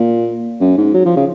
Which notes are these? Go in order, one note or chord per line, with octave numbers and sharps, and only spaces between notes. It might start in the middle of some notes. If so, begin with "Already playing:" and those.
Already playing: A#2
F#2
G#2
F#3
F3
C#3